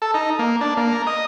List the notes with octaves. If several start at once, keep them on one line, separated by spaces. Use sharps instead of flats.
A4
D#4
A#3
D4
A#3
A#4
D#5